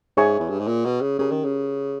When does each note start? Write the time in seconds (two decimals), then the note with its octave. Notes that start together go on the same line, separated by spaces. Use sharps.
0.17 G#2 G#4 C#5 E5 G#5 C#6
0.40 E2
0.49 G2
0.59 G#2
0.68 A#2
0.85 B2
1.01 C#3
1.19 C#3 C#4 G4 A#4
1.31 D#3
1.45 C#3